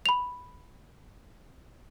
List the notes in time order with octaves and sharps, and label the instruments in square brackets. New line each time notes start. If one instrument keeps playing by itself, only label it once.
[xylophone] B5 F7